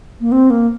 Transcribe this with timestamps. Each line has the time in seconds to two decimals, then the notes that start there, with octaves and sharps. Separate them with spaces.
0.20 A#3
0.31 C4
0.50 A#3